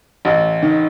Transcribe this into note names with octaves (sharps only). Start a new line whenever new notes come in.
A1
D#3